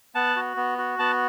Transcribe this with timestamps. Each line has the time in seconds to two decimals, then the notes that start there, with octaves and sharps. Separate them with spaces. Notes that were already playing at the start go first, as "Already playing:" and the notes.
0.15 B3 F#5 A5
0.36 F#4
0.57 B3
0.78 F#4
0.99 B3 F#5 A5